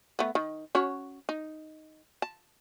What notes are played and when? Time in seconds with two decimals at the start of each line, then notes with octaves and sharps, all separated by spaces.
0.19 A3 B3
0.35 D#3
0.75 C#4 F#4 C#5
1.29 D#4
2.22 A5